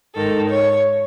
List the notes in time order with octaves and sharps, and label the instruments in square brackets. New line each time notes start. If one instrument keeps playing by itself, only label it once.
[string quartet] G#2 D#3 A4
C#5